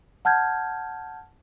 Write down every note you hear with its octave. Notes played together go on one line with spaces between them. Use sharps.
F#5 A5 F6 G6 G#6